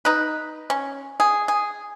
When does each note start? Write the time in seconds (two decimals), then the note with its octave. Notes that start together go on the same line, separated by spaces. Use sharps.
0.05 D#4 B4
0.70 C#4
1.20 G#4
1.48 G#4